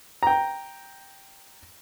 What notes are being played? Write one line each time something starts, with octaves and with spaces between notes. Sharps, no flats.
G5 A#5